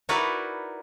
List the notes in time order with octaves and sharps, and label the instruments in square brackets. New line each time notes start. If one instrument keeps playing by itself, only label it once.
[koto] D#4 E4 F#4 A#4 B4 D5